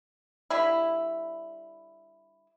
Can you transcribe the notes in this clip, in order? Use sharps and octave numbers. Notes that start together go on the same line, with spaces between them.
D3 G3 E4